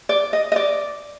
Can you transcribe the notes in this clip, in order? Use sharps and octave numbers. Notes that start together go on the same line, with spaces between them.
D5
D#5
D#5
D5